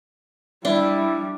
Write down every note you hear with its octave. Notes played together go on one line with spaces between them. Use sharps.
G3 D4 E4